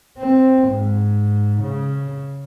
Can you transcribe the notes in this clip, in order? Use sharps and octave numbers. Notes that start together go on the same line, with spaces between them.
C4
G#2
C#3